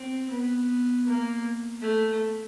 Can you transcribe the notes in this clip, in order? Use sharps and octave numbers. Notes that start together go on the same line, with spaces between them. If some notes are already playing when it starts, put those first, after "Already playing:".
Already playing: C4
B3
A#3
A3